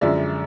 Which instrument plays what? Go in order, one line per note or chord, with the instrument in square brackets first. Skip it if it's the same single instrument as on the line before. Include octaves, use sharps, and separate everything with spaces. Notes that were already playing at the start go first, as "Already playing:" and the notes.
[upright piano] F#2 D3 F3 G#3 D5 E5